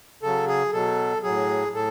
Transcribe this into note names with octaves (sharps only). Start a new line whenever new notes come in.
C#3 F#3 A4
G#4
B2 F#3 A4
A2 F#3 G#4
A2 A4